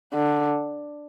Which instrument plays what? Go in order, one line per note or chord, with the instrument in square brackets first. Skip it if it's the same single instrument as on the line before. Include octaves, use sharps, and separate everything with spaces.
[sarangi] D3